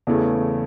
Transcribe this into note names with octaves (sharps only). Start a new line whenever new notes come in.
E2 C#3 E3 A3